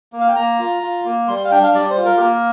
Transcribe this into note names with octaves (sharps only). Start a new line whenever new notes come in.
A#3
F5
G5
A#3 A#5
F4
F4
A#3
G3 C6
F5
D4 G5
F5
G3 D5
C5
F4
A#4
G4
A#3 A#4